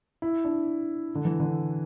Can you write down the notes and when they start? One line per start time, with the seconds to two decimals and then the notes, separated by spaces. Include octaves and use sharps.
0.22 E4
0.45 D4
1.15 D3
1.25 E3
1.40 D3